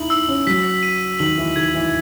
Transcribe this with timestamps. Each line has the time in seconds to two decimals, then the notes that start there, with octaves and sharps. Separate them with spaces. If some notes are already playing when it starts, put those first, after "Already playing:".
Already playing: D#4 E4 F#7
0.10 D#4 E6
0.28 C#4
0.47 F#3 B6
0.83 D#7
1.19 D#3 F#7
1.38 E3
1.56 D#3 G#6
1.74 E3